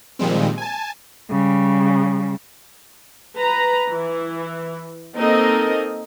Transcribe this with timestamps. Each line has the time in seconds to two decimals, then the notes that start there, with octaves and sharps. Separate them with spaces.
0.19 A#2 D#3 F3 G3 G#3 C4
0.58 G#5 A5
1.31 C#3 G3
3.37 B4 A#5
3.89 E3
5.17 A#3 C4 D#4 A4 A#4 D#5